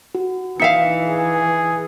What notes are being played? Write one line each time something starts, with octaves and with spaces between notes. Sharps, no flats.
F#4
E3 D#4 E5 F5 C#7
G#4